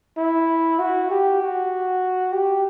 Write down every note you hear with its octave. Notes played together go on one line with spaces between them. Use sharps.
E4
F#4
G4
F#4
G4